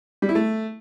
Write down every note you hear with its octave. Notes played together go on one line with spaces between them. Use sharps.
G3
E4
A3